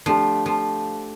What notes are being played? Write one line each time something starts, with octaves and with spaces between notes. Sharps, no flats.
F3 A3 D4 G4
F3